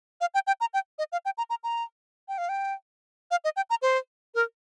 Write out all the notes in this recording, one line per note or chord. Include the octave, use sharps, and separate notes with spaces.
F5
G5
G5
A#5
G5
D#5
F5
G5
A#5
A#5
A#5
G5
F5
G5
F5
D#5
G5
A#5
C5
A#4